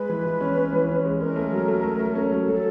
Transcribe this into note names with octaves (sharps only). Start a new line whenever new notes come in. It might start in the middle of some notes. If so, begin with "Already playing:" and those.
Already playing: G#3 B4
E3
E3
C#4
C#4
E3
C#4
G#3
C#4 A#4
A3
F#3
A3
A3
A3
C#4
F#3
F#3 A4